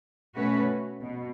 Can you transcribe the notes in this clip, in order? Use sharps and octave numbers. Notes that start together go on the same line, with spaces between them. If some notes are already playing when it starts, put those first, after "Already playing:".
B2 A3 C#4 F#4 B4
B2